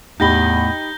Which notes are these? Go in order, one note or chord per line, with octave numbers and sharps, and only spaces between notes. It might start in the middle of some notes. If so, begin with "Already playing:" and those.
E2 A2 D#4 G4 B5 G6 A#6 G7